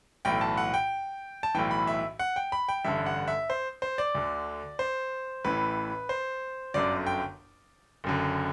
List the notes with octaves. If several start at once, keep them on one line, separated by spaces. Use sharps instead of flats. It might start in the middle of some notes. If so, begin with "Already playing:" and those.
B1 A2 E3 G5
A5
F#5
G5
A5
B1 A2 E3 G5
B5
E5
F#5
G5
B5
G5
A1 G2 D3 E5
F#5
E5
C5
C5
D5
D2 D3
C5
A1 A2 E3 B4
C5
G1 F#2 D3 D5
G5
F#1 F#2 D3